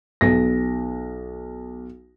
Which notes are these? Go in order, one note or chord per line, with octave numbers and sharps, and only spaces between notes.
B1 A#6